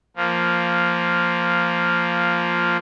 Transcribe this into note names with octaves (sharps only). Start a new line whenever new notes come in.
F3 A#3